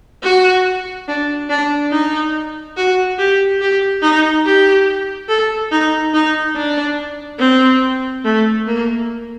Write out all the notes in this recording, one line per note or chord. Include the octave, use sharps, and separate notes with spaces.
F#4
D4
D4
D#4
F#4
G4
G4
D#4
G4
A4
D#4
D#4
D4
C4
A3
A#3